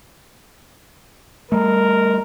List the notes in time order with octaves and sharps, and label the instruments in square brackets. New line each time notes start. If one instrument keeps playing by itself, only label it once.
[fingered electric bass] G3 A3 [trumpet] A#4